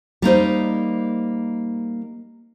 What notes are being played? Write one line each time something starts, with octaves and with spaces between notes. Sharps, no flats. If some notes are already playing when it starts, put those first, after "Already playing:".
G3 A#3 D#4 C5